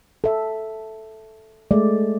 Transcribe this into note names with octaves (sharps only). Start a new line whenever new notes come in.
A4 E5
G#3 A3 D5